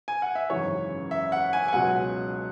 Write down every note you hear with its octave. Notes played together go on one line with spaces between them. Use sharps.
G#5
F#5
E5
G#1 F#2 C#3 E3 C#5
E5
F#5
G#5
G#5
C#2 B2 F#3 F#5